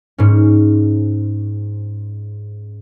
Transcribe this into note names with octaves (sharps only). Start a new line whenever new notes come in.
G#2 C#4